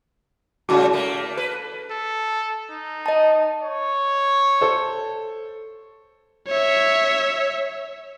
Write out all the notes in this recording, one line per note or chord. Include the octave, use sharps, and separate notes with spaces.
G#2 C#3 G3 F#4
A3 A#3
B4
A4
D#4
D#5 A5
C#5
A4 C5
C#5 E5